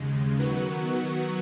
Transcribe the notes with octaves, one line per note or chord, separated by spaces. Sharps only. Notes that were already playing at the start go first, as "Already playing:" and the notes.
Already playing: D#2 C#3 G#3
D#3 F#3 B3 F#4